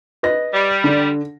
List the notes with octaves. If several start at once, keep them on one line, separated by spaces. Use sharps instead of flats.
B4 D#5 A#6
G3
D3